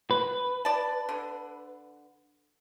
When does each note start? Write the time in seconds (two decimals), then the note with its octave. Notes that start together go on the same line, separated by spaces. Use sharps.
0.11 B4
0.65 D5 A5
1.09 D3